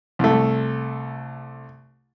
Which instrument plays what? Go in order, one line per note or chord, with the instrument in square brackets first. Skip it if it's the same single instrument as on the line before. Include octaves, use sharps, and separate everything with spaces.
[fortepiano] C2 A3